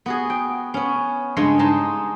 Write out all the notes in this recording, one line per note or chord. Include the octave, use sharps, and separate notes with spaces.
B3 F#4 G#4
G5
B3 C#4
G2 C#3 G#3 C#5 C6
G#3 D#4 A5 C6